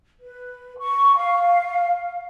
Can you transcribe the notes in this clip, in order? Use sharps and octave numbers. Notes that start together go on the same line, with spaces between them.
B4
C#6
F5